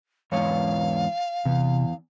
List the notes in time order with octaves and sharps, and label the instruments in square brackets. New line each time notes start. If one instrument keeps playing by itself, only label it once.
[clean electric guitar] E2 G#2 C#5 [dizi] F5
[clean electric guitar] E2 [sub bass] C3